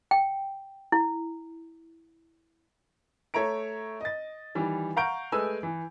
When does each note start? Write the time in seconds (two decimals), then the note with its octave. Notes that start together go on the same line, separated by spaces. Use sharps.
0.11 G5
0.92 E4
3.34 A3 C#5 E5 A#5 D7
4.01 D#5 A6
4.55 D#3 E3 G3
4.97 F5 F#5 A#5 C#6 G6 D7
5.32 G#3 A3 B4 G#5 E6
5.63 E3